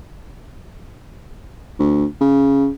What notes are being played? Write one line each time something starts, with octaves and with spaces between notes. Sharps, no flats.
D2
C#3